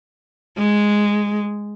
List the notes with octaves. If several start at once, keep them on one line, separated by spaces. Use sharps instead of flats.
G#3